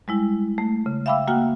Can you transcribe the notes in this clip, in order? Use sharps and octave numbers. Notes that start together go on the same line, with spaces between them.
G3 G#3 E4
A3
C#3
E5 F5 G5 B5 D6 E6
A#3 F#4 F#5 G5 F6